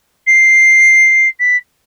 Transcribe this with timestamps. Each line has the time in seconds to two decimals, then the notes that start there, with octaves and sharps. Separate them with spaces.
0.27 C7
1.40 B6